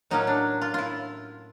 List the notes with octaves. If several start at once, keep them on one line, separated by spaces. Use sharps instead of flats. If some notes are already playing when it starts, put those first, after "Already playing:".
A2 F#3 A#3 C#4 D#4
D4
F4
E4 F4